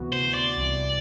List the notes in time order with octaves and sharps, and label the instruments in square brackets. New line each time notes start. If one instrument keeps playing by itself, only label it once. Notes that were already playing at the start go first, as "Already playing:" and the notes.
Already playing: [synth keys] D2 C3 E3 B3 F#4
[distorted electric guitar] C5
D5
[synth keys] C2 C3 E3